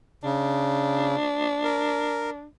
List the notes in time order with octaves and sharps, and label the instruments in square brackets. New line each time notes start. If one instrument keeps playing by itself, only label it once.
[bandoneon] C#3 [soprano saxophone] D4
[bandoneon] A#4